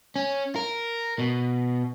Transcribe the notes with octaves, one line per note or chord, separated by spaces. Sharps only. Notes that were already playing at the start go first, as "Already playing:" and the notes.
C#4
A#4
B2